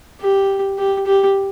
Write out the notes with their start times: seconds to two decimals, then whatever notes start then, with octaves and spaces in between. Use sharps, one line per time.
0.21 G4
0.78 G4
1.06 G4